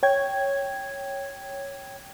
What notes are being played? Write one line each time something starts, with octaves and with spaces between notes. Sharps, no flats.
C#5 G5 G#6